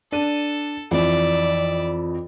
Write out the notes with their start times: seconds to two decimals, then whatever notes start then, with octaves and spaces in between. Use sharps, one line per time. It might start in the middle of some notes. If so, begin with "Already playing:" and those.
0.12 D4 A4 D#7
0.91 F2 E3 D5 E5